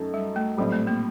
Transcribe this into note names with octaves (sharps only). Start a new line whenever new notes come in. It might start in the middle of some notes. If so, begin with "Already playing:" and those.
Already playing: F#2 F#3 A3 D#4 A4
G3
A3
A#1 A2 F#3 G3 C4
A3
A#3